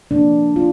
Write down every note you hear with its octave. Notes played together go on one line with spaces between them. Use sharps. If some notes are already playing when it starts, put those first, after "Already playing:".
C3 F3 A#3 D4
F4